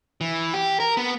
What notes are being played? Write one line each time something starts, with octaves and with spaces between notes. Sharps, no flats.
E3
G4
A#4
B3